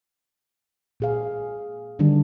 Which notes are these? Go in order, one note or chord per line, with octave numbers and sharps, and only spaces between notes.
A#2 G#4 F5
D3 D#3 G3 D4